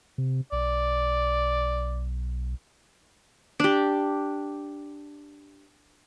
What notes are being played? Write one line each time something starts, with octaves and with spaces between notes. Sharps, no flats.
C3
B1 D5
D4 G4